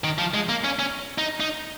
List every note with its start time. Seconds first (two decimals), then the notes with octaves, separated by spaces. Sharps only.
0.04 D#3
0.18 F3
0.34 G#3
0.49 A#3
0.64 C#4
0.79 C#4
1.18 D#4
1.40 D#4